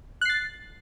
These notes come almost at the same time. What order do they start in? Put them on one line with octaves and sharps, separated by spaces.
F#6 C7 A6